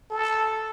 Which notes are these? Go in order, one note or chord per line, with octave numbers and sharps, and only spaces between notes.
A4